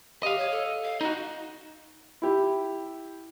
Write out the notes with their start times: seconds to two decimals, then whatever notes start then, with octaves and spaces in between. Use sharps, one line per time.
0.23 G4 D#5 F5
0.38 C#5
0.51 A4
0.84 F5
1.01 D#4 F#4 D#5
2.22 E4 G4